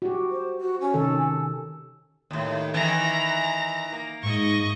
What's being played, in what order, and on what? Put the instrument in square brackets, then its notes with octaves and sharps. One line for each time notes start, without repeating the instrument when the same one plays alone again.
[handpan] F#4 G4
[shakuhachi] C5
F#4
C#4
[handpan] C3 D#3 A4
[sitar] D#2 A2
[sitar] D#3 E3 [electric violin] A#5
[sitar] A#3
[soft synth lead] G#2 [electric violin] D#5 C#6